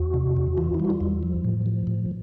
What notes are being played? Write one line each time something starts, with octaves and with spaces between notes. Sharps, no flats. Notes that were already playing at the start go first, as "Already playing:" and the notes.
Already playing: E2 F#4
C3
E2
E3 F4
E4
G3
F#4
F4
E2
F3
A2
F3
A2